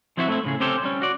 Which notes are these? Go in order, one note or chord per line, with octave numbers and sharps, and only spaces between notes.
F3 C4 E4 F#4 C5 E5
A3 C4 E4
A2 C#3 G#4
C4 C#4 G4 A4 C5
G3 C#4
F#4 D5